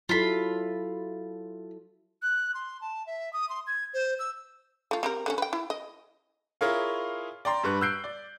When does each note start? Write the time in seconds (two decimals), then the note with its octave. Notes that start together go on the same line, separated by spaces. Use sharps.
0.09 F#3 E4 F4 A4 B5
2.22 F#6
2.54 C6
2.81 A5
3.07 E5
3.33 D#6
3.49 C6
3.67 G#6
3.94 C5
4.19 E6
4.91 A3 F4
5.03 C4 G4 A#4
5.26 D3 G#3 C#4
5.38 B4 G5
5.53 E4
5.70 D#5
6.61 E4 F4 G#4 A#4 C#5 F5
7.45 D5 G5 A#5 C6
7.64 G2 G3 B4 C#6 F#6
7.81 E6 F#6 G6 C7 D7
8.04 D5